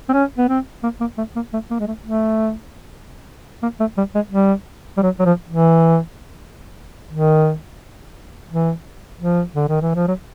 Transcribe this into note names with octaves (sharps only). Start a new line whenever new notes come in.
C4
C#4
B3
C4
A#3
A#3
A3
A#3
A3
A#3
G#3
A3
A3
A#3
A3
G3
G#3
G3
G3
F#3
F#3
F3
E3
D#3
E3
F3
D3
D#3
E3
F3
F#3